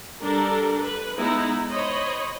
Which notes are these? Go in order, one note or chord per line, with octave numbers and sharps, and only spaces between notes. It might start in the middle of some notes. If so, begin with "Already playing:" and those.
G3 D4 A4 A#4
B4
G#3 B3 D#4 E4
C5 C#5 D#5 B5